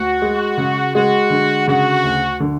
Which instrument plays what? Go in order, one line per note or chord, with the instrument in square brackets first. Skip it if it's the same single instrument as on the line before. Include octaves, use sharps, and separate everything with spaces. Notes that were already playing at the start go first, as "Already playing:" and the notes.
Already playing: [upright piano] D2 [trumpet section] F#4
[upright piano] G#3
C#3
[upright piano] G#3 [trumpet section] F#4
[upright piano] D3
[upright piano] C#3 [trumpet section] F#4
[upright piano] D2
D3